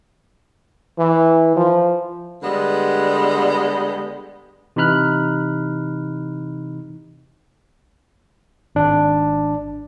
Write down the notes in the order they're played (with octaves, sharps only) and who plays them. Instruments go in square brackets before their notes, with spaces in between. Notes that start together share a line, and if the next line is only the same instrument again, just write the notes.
[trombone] E3
F3
[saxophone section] D3 G3 G#3 B3
[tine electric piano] C3 E3 D#4 B5 F6 F#6
G#1 D4